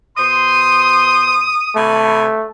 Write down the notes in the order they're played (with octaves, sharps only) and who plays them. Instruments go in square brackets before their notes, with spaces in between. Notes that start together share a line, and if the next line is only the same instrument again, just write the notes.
[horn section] B2 C5 C6 [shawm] D#6
[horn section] C3 G#5 B5 [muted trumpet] A3